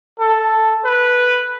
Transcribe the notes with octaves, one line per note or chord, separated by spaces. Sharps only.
A4
B4